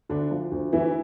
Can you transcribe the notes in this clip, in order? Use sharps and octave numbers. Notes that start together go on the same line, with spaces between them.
D2 D3 D4
F3
D2
D2 E3 E4